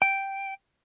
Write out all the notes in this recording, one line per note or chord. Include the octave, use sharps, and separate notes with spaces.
G5